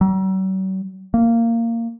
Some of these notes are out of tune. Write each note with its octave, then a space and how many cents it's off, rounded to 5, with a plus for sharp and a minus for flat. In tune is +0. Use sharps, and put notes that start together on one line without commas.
F#3 +45
A#3 -15